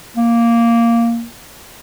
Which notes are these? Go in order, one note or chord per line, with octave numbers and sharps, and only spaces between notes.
A#3